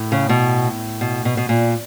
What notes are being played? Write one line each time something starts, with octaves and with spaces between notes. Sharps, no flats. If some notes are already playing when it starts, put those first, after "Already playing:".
Already playing: A2
C#3
B2
B2
B2
B2
A#2